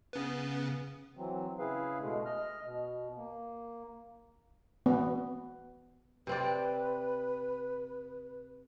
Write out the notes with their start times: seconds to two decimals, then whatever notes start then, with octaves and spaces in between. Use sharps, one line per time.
0.13 C#3 B3
1.17 E3 F#3 C4
1.59 C#3 E4 G#4 B4 F5
2.01 B2 G#3 A3
2.25 D#5 F6
2.64 B2
3.17 A#3
4.86 B3
6.27 C3 C4 B4 D5